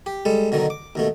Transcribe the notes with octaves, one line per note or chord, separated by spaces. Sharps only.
G4
G3 G#3 A4
B2 D3 D#3 F#3
D6
D#2 B2 A3